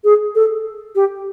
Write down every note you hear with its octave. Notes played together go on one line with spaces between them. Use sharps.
G#4
A4
G4